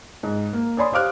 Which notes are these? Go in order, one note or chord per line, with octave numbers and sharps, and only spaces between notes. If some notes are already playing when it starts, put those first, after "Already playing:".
G#2
A#3
C#5 D5 G#5 B5 C6 D#6
G4 C5 F5 D6 F6 F#6